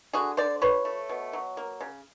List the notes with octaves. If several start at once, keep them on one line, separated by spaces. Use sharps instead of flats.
D3 F#4 G#4
D3 C5 D5
F3 B4 C#5
A3
B2
F#3
A#3
C#3